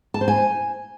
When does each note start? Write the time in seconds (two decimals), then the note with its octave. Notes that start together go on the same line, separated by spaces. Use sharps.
0.14 A5
0.21 C5
0.28 G#5